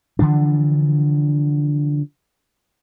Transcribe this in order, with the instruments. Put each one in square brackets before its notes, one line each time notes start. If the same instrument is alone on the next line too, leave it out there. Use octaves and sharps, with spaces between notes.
[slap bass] D3 E3 F3 D4